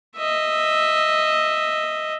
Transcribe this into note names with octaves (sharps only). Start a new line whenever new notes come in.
D#5 E5